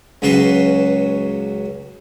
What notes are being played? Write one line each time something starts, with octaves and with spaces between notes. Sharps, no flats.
C#2 F#3 C#4 F#4 B4 C6